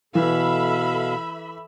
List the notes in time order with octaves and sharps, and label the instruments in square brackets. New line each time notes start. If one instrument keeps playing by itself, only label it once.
[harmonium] B2 F5 [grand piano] E3 [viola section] A4 E5 B5